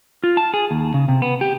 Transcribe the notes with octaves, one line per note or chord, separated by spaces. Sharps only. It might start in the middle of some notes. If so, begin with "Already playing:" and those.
F4
A5
G#4
D#2
C#3
C3
B3
G4